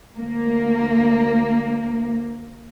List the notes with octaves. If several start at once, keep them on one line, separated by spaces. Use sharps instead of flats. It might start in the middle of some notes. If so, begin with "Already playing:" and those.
D2 A#3